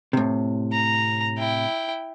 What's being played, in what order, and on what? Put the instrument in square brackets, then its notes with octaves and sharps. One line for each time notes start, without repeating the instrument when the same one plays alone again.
[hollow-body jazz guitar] A2 C3
[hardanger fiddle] A#5
E4 G5